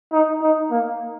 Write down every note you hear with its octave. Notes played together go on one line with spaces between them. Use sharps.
D#4
D#4
A#3